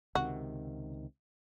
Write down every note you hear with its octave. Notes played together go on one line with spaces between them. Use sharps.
C#2 C3 D#3 F#4